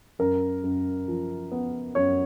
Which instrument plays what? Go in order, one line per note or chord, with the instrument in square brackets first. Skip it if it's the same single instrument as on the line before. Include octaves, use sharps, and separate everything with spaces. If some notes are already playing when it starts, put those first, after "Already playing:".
[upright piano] F#2 A#4
F#2
F3
B3
F#2 C#5